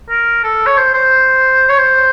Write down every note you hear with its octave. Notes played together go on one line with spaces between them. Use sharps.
A#4
A4
C#5
C5
C5
C#5
C5